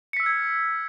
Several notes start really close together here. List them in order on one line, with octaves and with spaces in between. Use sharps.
C#7 B6 E6 F6 G#6